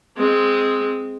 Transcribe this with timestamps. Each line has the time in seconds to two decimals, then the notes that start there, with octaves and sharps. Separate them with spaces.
0.17 G#3 C4